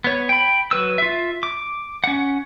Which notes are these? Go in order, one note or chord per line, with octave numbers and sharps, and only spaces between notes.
B3 C#5
G5 B5
F#3 B4 E6
F4 E5
D6
C#4 F#5